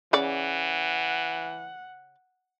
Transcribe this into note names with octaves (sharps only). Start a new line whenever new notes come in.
C#3 E3 C#5 D5 F#5